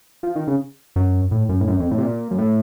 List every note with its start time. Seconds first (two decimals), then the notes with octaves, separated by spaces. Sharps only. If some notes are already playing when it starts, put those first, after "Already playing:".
0.23 F3
0.35 D#3
0.47 C#3
0.96 F#2
1.31 A2
1.49 F#2
1.61 A2
1.68 F#2
1.80 F2
1.91 A2
1.98 C3
2.03 A#2
2.31 F#2
2.39 A2